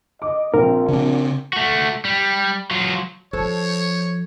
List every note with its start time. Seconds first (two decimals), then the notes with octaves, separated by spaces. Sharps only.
0.22 D#5 D6
0.54 A#1 C4 A#4
0.88 C#3 C4 D4
1.53 A3 F#4
2.05 G3
2.71 F#3 F4
3.33 F3 A4 C5 C#5